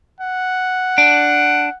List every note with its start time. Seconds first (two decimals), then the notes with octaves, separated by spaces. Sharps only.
0.20 F#5
0.98 D4